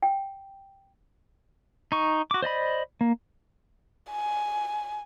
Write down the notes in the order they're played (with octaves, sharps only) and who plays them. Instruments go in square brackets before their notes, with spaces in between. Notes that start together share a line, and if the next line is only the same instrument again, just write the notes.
[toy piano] G5
[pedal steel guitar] D#4 C#6
F#4 D6
C5 D5 D#5 B5
A#3
[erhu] G#5